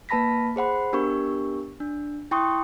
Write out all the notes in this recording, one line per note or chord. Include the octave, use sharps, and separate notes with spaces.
A#3 B4 A5 B5 A#6 B6
G#4 C5 F#5 B5
B3 D4 G4 A#4 C#6
D4
E4 G5 C6 C#6 D#6